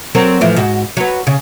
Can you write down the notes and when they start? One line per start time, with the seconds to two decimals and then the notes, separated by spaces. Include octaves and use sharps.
0.15 F#3 C4 A#4
0.41 A2 E3 F3
0.56 G#2 F#4
0.97 F#3 B4
1.27 C#3